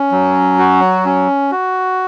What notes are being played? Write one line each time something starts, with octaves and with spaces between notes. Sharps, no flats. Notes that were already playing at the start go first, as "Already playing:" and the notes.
Already playing: C#4
F#3
F#4
C#4
F#4